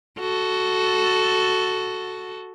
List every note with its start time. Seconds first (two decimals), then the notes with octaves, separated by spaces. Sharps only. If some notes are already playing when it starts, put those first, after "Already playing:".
0.19 F#4 A4